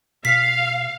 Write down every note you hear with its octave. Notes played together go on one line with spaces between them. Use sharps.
B2 F5 B6 C7